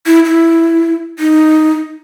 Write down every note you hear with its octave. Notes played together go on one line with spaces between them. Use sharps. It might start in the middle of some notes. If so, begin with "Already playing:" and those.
E4
E4
D#4